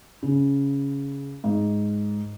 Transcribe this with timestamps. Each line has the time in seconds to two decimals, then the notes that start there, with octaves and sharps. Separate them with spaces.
0.23 C#3
1.44 G#2